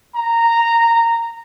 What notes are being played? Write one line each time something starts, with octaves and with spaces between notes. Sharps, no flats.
A#5